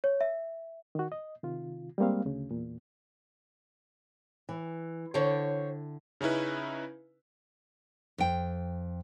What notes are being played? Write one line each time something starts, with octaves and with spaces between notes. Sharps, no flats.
C#5
E5
D#3 F#4
D#5
C3 D#3 F4
G3 G#3 A#3 C4 F5
D2 C#3
E2 A#2
E3
D3 E4 C5 C#5 G5
C#3 C#4 D#4 E4 B4
F2 G5